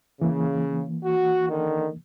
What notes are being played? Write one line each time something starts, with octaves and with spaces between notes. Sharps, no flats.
C#3 E3 A#3
F#4
D3 D#3